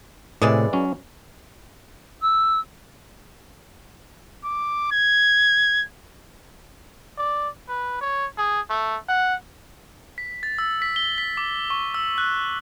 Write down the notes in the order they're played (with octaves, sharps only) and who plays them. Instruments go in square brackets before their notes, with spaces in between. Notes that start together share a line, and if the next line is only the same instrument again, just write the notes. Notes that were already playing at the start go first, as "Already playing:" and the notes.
[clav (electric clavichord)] A2 C3 [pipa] E3 G#3 D5
[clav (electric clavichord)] F#3 C#4
[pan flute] E6
[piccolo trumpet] D6
G#6
[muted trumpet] D5
B4
C#5
G#4
A3
F#5
[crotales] B6
A6
E6
B6
G7
B6
D6
C#6
E6
F#6